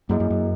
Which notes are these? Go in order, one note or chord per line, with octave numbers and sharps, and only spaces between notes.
F#2 A#3 E4 G#4 D#5
F#2
F#2